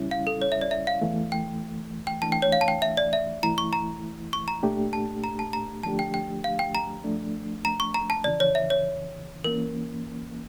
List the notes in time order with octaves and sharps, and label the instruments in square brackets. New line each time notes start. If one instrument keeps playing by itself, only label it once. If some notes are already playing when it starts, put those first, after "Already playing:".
Already playing: [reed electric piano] E2 C#3 G3 C#4 E4
[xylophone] F5
A4
C#5
E5
D5
E5
F5
[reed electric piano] E2 E3 A3
[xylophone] G5
G5
[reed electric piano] E3 A3 D4 [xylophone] A5
[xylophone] G5
C#5
F5
A5
G5
E5
D5
E5
[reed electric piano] G2 E3 A3 E4 [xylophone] A#5
[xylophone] C#6
A#5
C#6
A#5
[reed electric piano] A#2 A3 D4 G4
[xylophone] A5
A#5
A5
A#5
[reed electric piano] D3 F3 A3 D4 G4 [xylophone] A5
[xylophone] G5
G5
F5
G5
A#5
[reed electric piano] G2 F3 A3 D4
[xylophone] A#5
C#6
A#5
A5
[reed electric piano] F2 C#3 E3 [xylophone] D5
[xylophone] C#5
E5
C#5
[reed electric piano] E3 A#3 C#4 [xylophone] A#4